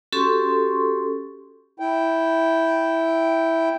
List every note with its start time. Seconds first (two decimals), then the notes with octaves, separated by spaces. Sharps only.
0.12 C#4 F#4 G4 A4 C6 C#6
1.80 E4 G5